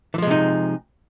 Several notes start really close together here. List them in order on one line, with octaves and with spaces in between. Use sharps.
E3 F3 G#3 C3 D#4